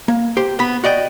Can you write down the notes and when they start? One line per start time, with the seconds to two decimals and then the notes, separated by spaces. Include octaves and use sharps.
0.08 A#3
0.37 G4 C5
0.59 B3 B5
0.84 F#4 D5 D#5 G5